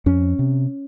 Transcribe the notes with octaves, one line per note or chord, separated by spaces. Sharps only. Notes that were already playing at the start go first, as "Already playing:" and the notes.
F2 C#4
C3